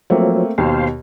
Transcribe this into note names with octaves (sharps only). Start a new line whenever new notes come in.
F3 F#3 A3 A#3 C4
D#2 B2 C5 F5